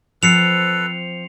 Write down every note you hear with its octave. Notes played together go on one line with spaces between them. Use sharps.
F3 C4 A4 B4 C7 C#7 F7